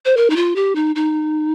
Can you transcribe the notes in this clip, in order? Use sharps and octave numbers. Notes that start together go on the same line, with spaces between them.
C5
A#4
D#4
F4
G4
D#4
D#4